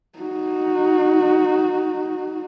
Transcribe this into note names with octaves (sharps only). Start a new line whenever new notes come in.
D#4 F#4